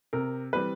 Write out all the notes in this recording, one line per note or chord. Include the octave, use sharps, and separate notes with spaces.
C3 A#4
E3 G3 C4 B4